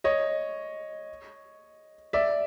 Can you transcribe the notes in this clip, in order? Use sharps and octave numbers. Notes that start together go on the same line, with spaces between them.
C#5 D#5
D5 E5